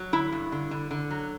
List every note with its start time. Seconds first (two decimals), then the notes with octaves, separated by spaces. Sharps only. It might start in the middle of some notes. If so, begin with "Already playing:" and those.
Already playing: F#3
0.13 D3 E4
0.32 G2
0.52 D3
0.71 D3
0.91 D3
1.10 F#3